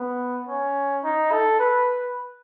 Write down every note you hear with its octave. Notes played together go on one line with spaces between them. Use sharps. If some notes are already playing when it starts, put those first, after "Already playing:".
Already playing: B3
C#4
D#4
A4
B4